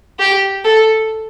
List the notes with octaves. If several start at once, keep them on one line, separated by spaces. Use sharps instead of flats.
G4
A4